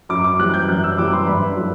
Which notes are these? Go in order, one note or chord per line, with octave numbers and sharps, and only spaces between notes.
F#2 D6
D6
E3 G3 F#6
G6
F#2 F#6
E6
E3 G3 D6
C6
G2 B5
F#3 A3